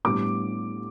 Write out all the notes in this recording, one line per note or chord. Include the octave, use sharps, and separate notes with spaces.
A2 G3 B3 D4 D6